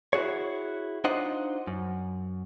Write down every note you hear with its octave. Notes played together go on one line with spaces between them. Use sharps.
E4 F#4 G#4 C#5
D4 D#4 F4 C5 D#5 F#5
F#2